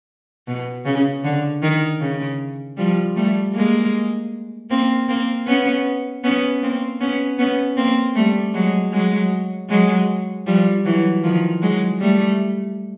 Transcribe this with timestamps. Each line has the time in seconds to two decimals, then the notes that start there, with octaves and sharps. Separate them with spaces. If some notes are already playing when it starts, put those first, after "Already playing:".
0.47 B2
0.85 C#3
1.24 D3
1.62 D#3
2.00 C#3
2.77 F3 G3
3.16 G3 A3
3.54 G#3 A#3
4.70 A#3 C4
5.09 A#3 C4
5.47 B3 C#4
6.24 B3 C#4
6.62 A#3 C4
7.00 B3 C#4
7.39 B3 C#4
7.77 A#3 C4
8.15 G3 A3
8.54 F#3 G#3
8.93 F#3 G#3
9.69 F#3 G#3
10.46 F3 G3
10.85 E3 F#3
11.23 D#3 F3
11.62 F#3 G#3
12.00 G3 A3